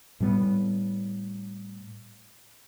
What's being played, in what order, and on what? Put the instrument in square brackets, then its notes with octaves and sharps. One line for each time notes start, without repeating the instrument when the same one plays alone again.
[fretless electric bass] A2 G3 A#3 B3